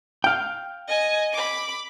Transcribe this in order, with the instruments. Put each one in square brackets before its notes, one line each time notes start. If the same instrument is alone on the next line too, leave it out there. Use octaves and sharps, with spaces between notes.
[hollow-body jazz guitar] F5 G5
[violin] D#5 G#5
B5 D6